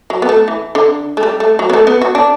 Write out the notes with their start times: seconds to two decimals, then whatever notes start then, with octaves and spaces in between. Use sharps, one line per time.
0.10 F#3
0.22 B3
0.29 A3
0.48 E3
0.75 D3
1.17 A3
1.23 G3
1.40 A3
1.59 F#3
1.70 B3
1.73 A3
1.87 B3
2.01 F#4
2.15 D4